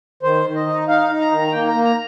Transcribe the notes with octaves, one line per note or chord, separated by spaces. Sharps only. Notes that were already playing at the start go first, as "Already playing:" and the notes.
D#3 C5
D#3
D#5
D#4
D#4 F5
D#4
A#5
D#3
A#5
A#3 G5
A#5
A#3
A#5